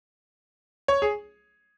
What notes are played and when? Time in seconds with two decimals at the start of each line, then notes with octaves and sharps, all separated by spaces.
0.88 C#5
1.02 G#4